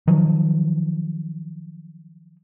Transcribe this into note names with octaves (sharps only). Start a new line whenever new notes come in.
D#3 F3 F#3